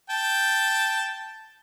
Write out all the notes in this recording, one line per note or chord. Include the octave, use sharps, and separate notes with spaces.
G5 A5